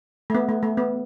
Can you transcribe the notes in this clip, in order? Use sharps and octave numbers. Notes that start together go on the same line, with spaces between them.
A3
B3
A3
A3
B3